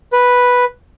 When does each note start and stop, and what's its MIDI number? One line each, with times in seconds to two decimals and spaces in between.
0.13 0.65 71